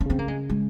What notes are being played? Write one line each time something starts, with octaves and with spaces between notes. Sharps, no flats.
C#4
C#3 C4
A#3
G#3
G#3